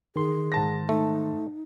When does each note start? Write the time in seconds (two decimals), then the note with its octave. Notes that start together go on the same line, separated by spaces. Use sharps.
0.16 D#3 G#4 C6
0.52 G#2 A5 A#6
0.89 A3 D#4